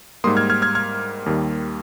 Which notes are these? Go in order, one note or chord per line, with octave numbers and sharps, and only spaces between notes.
G#2 G3 A#3 C6 D#6
F6 G#6
F6 G#6
F6 G#6
F6 G#6
D#2 D#3 G3 A#3